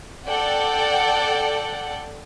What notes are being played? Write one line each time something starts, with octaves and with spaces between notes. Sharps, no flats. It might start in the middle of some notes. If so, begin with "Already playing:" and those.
A4 D5 F#5 G5